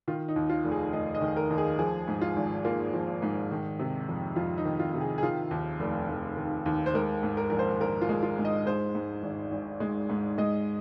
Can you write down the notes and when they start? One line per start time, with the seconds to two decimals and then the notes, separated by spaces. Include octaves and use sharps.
0.08 D#3 F4
0.28 D#4
0.36 D#2
0.50 F4
0.64 F1
0.71 G#4
0.93 F1 D#5
1.15 D#5
1.21 D#3
1.36 A#4
1.50 D#2
1.58 G#4
1.79 F3 G#4
2.08 G#2
2.22 F4
2.36 G#1
2.65 A#3 F4
2.93 F3
3.22 G#2
3.51 D#3
3.79 C3
4.09 F2
4.36 F2 F4
4.58 D#4
4.65 D#3
4.80 F4
4.94 C3
5.01 G#4
5.18 G#4
5.23 D#3 F4
5.51 D#2
5.80 F1
6.09 F1
6.37 D#3
6.66 D#2
6.86 C5
6.94 G#3 A#4
7.23 G#2
7.37 A#4
7.50 A#1 A#4
7.59 C5
7.81 A#1 A#4
8.02 F4
8.09 G#3
8.23 F4
8.38 G#2
8.45 D#5
8.66 G#3 C5
8.95 G#2
9.23 G#1
9.52 G#1
9.80 G#3
10.10 G#2
10.38 G#3 D#5